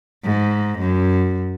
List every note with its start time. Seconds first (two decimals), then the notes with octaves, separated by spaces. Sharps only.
0.24 G#2
0.79 F#2